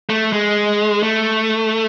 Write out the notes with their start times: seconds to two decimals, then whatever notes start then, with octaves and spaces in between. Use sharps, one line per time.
0.10 A3
0.33 G#3
1.03 A3